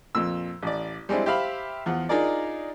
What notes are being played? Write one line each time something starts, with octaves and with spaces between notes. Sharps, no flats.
F2 A#2 E6
A1 D5
G3 G#3 C4 D4 E4
G4 C5 E5 F5 B5
E2 F3 F4 F#5
D4 D#4 F4 G#4 A#4 D5